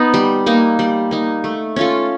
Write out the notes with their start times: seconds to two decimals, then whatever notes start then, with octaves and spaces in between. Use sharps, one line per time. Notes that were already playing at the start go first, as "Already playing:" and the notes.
Already playing: B3 D#4
0.14 G3
0.46 A#3 D#4
0.79 G3
1.11 A#3 D#4
1.44 A3
1.76 C#4 F4 A4